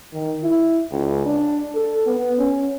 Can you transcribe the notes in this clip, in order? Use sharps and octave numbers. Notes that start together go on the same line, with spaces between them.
D#3
E4
C#2
D4
A4
B3
C#4